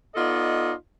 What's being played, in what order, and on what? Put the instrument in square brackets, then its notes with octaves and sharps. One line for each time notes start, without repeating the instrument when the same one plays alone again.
[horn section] B3 D#4 F4 A4 D5 D#5